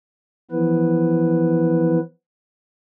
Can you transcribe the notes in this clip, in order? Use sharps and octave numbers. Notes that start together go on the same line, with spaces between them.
E3 F3 B3 E4 B4